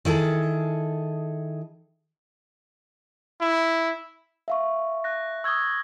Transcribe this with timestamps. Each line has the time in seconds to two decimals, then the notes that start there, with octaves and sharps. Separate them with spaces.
0.05 D#3 E4 G#4 A4
3.41 E4
4.48 E5 F5 C#6
5.04 F#6 A#6
5.44 C#6 D#6 E6 G#6 G7